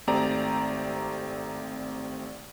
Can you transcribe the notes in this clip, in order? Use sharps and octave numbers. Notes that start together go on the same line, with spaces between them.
G#1 A3 C4 G4 D5 A#5